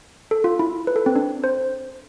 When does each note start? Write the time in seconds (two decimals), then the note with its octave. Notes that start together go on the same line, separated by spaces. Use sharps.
0.31 A4
0.44 F4
0.59 E4
0.87 B4
0.96 A4
1.06 C4
1.16 D4
1.44 C5